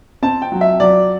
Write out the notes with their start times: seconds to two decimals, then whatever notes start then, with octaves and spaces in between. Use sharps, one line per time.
0.22 C4 A5
0.42 G5
0.52 F#3
0.61 E5
0.80 F#3 D5